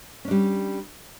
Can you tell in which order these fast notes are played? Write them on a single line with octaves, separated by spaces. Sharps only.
C#4 D4 G3